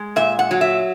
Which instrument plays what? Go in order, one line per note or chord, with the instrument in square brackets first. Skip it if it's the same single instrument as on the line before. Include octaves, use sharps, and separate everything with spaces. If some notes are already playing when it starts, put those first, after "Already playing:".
Already playing: [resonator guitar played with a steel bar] G#3
A#2 E5
F#5
F#3
E5